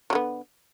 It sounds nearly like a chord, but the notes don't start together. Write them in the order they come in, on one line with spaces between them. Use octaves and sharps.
F#3 D3 B3